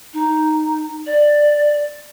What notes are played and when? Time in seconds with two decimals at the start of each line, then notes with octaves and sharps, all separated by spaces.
0.13 D#4
1.06 D5